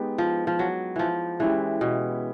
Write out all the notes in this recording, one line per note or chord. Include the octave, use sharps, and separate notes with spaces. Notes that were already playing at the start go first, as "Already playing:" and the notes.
Already playing: G#3 B3 D#4 G4
F3
F3
F#3
E3 F3
E3 G#3 C#4 E4 G4
B2